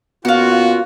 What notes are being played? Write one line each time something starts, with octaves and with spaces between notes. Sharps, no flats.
B2 A#3 C#4 F4 F#4 F5 F#5